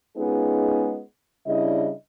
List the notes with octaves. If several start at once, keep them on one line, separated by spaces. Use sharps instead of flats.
G#3 B3 C#4 D#4 F4 G#4
C#3 G3 D4 E4 D#5